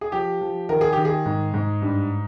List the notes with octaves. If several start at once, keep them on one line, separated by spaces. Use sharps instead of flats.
G#4
F3 G4
F3
D#3 A#4
G#4
D#3 G4
G#4
G#2
G#2
G2